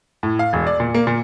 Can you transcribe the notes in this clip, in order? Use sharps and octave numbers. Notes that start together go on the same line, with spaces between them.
A2
F5
E1
D5
A#2
A#3
A#2